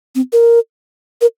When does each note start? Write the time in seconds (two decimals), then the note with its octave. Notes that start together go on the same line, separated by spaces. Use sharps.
0.15 C4
0.33 A#4
1.21 A#4